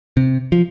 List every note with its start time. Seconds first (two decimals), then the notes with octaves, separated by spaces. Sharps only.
0.17 C3
0.52 F3